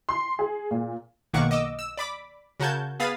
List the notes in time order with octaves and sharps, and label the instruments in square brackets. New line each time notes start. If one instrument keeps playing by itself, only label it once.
[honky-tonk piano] C6
G#4
A#2
[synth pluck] B1 D#3 A#3 F#5 C#6 D6
D#5 D6 E6
E6
D5 B5 D6
C#3 F#4 A#4 A5 G6 G#6
B3 G#4 F5 B5 D#6 A6